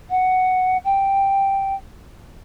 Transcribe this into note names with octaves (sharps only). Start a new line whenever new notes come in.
F#5
G5